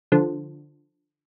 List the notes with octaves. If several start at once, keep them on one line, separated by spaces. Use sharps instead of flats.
D3 F3